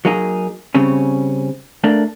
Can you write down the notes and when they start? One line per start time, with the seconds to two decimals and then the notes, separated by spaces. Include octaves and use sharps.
0.05 F#3 A#3 D#4 G#4
0.75 C#3 G3 C4 C#4
1.84 A3 A#3 D4